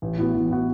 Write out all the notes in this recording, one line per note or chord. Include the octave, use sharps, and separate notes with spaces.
A1
A2 E3 B3 F#4
A1
A2 E3 B3 F#4